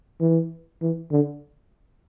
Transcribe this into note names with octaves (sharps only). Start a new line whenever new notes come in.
E3
E3
D3